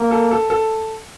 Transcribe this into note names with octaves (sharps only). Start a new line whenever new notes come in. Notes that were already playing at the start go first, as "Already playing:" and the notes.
Already playing: A#3
A4
A4
A4